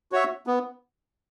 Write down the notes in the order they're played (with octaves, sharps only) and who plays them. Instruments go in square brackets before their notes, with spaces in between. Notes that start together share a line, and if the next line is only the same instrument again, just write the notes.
[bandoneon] F#4 C#5 E5
B3